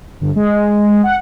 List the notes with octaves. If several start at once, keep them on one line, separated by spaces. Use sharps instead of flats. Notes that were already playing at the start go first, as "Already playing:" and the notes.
G1
G#3
F#5